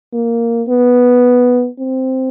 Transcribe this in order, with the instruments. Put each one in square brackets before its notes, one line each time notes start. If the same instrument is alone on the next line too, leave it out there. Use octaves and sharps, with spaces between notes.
[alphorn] A#3
B3
C4